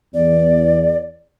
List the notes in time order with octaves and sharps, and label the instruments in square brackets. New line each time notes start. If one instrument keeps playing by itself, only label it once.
[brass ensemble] E2 [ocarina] D5